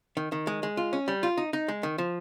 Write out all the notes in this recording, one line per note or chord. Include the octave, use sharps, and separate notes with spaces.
D#3
D#3
G#3
G#3
F4
C#4
G3
F4
D#4
D#4
G#3
D#3
F3